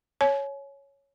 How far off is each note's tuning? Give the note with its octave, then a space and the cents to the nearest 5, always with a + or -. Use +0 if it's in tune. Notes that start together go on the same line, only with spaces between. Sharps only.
C#5 +0 G#5 +40